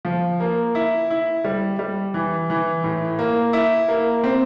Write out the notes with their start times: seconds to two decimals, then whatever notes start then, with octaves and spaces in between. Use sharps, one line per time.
0.05 F3
0.40 A#3
0.75 E4
1.10 E4
1.44 G3
1.79 G3
2.14 E3
2.50 E3
2.84 A2
3.19 A#3
3.53 E4
3.88 A#3
4.24 C4